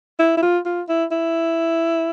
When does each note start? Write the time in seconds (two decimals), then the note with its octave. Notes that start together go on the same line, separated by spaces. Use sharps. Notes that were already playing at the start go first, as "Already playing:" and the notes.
0.19 E4
0.37 E4
0.42 F4
0.66 F4
0.89 E4
1.11 E4